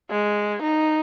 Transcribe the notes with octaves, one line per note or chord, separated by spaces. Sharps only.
G#3
D#4